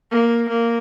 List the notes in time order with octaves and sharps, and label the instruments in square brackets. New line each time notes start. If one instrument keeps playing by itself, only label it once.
[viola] A#3
A#3